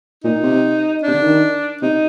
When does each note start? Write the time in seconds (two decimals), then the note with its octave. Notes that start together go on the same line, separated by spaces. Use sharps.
0.24 A#2 D#4
0.43 C3
1.03 C3 D4
1.14 D3
1.22 D#3
1.82 C3 D#4